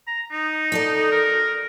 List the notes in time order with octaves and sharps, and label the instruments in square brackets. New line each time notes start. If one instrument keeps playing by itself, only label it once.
[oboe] A#5
D#4
[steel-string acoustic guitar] F#4 A4 D5
[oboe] A#4